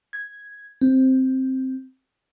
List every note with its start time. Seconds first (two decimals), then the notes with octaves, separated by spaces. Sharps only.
0.13 G#6
0.81 C4